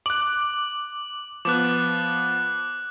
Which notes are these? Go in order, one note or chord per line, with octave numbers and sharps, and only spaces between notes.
D6 F#6 F#7
F3 B3 D6 F#6